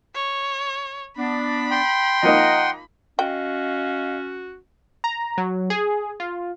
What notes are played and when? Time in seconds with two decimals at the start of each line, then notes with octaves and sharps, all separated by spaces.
0.15 C#5
1.17 B3 D4 B5
1.71 G5 C6
2.23 F3 A#3 D#4 D#5 F#5 A#5
3.19 C#4 F#4 D#5 F5 G5
5.04 A#5
5.38 F#3
5.70 G#4
6.20 F4